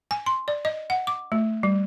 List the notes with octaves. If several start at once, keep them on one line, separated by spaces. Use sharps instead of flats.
G#5
C6
D5
D#5
F#5
D6
A3
G3